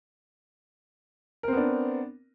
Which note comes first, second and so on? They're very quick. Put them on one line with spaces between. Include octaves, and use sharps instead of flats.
A#4 C4 B3 D4